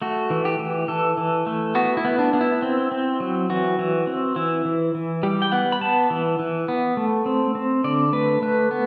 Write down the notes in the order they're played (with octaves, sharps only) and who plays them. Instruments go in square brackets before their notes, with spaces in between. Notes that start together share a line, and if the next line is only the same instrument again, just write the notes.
[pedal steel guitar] A3 F#4
E3
G4
E3
E3 A4
E3
A3
B3 F#4
E4
B3
D4
B3
E4
C4
C4
F#3
E3 F#4
E3
C4
E3 E4
E3
E3
G3 G4
G5
B3 F#5
B5
B3 A5
E3
E3
B3
A3
C4
C4
D3 D5
A3 B4
A3 B4
B3